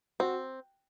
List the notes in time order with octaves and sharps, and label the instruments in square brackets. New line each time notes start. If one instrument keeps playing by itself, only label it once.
[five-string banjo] C4 [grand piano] F#4